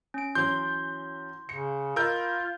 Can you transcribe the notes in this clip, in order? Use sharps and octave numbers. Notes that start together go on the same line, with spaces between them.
C#4 D7
E3 F#3 C#4 C6 G6
C#3 C#7
F4 A#4 D#5 B5 E6 G6